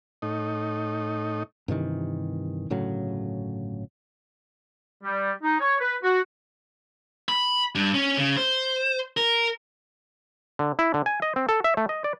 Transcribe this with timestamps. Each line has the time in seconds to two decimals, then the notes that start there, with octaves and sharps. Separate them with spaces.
0.22 A2 D#4
1.68 G2 C3 D#3 E3
2.70 G1 A2 C#3 F#3
5.04 G3
5.43 D#4
5.60 C#5
5.80 B4
6.02 F#4
7.29 B5
7.75 G2
7.94 C#4
8.18 C#3
8.37 C5
9.17 A#4
10.59 D3
10.79 E4
10.94 D3
11.06 G#5
11.22 D#5
11.36 C4
11.49 A4
11.64 E5
11.77 A3
11.89 D#5
12.04 D5